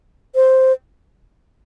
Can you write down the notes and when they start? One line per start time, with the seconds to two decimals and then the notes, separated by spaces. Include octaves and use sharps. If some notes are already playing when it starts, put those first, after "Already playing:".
0.35 C5